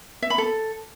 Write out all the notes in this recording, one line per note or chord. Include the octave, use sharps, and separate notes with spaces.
E5
B5
A4